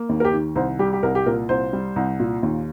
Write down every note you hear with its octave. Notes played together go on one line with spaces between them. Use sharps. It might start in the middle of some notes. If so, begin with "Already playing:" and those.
Already playing: A#3
D#2
A#4
G4
D#3
C2 C5
G3 G4
G4
C2 A#4
G4
A#2 A#4
C2 C5
G3
C2
A#2
D#2